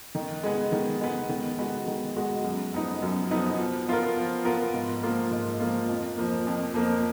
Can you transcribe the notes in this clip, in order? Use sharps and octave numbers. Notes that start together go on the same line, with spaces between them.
D#3
G#3 B3
D#3
G#3 B3
D#3
G#3 B3 F#4
D#3
G#3 B3 F#4
F#2
F3 B3 D#4
F#2
F3 B3 D#4
F3
B3 F4 A#4
F3
B3 F4 A#4
G#2
F3 A#3 F4
G#2
F3 A#3 F4
F2
F3 A#3
F2
F3 A#3